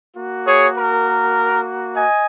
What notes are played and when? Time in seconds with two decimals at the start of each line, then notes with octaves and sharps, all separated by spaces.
0.16 A#3 F#4
0.45 G#4 C#5
0.76 A#4
1.95 D#5 G#5